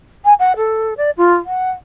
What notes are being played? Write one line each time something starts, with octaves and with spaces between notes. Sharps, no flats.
G#5
F#5
A4
D5
F4
F#5